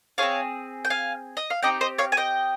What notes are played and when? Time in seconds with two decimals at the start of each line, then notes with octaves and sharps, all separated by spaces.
0.18 C4 F4 G#4 C#5 F5
0.85 G5
0.90 F5 G#5
1.37 D#5
1.50 F5
1.63 C4 D#4 G4 D#5 G5
1.81 C5 D#5
1.98 C#5 F5
2.12 G#5
2.17 D#5 G5